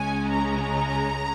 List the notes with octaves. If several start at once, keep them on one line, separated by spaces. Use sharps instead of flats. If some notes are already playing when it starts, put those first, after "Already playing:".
Already playing: C#2 C#3 G#3 C#4 G#5
A#5